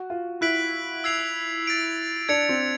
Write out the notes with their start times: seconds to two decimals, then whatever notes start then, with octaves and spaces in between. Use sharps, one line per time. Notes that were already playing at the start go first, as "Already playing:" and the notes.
Already playing: F#4
0.10 F4
0.41 E4 F#6 B6 D7 F#7
1.04 E6 G#6 C7 F7
1.66 A6 D7 F7
2.29 D4 G#6 C#7 F7
2.49 C4